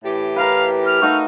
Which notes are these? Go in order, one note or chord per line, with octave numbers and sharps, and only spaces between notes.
A2 E3 G4
A#4 B4 F5
F6
A3 D#4 F#4 F5